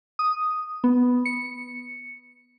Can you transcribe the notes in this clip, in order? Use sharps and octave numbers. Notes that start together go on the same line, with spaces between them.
D#6
B3
C#7